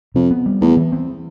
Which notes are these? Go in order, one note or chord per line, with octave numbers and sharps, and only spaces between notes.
F2 C3
B3
G3
E2 A3
E3
C4